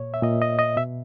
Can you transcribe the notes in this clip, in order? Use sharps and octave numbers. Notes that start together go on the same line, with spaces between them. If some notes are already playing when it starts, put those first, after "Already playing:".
Already playing: A#2 C#5
E5
A#2 D#5
D#5
D#5
B2 E5